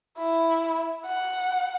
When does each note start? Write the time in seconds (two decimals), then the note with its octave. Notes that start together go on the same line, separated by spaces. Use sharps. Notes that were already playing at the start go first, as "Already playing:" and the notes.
0.18 E4
1.06 F#5